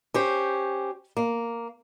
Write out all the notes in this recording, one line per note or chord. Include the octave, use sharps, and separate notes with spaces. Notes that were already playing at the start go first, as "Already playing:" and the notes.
C#4 G4 C5
A#3